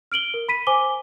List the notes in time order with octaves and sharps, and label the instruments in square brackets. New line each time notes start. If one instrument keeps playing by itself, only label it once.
[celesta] F6 D7 F#7 G7
A#4
B5 B6 D#7
C5 G#5 D6 G7